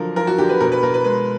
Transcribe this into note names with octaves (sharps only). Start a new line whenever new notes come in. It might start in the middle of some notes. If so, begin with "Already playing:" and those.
Already playing: D3 F3 F#3 A#4
F3 A#4
F#4
D3 G4
B4
B2 A#4
B4
B2 A#4
B4
G#3 B4